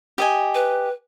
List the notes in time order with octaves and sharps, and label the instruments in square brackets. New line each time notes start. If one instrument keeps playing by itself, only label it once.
[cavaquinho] G4 D#5 G#5
[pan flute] B4